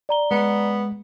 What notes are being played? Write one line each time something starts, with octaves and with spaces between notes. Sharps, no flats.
D5 A#5 G7
G#3 B3